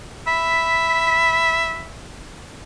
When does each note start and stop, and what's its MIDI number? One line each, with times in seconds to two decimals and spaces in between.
0.27 1.90 76
0.27 1.89 83